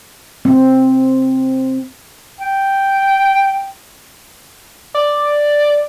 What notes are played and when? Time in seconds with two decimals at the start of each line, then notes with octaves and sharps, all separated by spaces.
0.45 C4
2.41 G5
4.94 D5